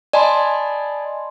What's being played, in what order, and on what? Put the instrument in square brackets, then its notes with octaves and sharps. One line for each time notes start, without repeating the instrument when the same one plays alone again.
[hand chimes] D5 D#5 G#5 A5 B5 C6